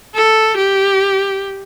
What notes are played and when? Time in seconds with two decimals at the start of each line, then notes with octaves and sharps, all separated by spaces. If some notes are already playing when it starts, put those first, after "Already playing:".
0.15 A4
0.57 G4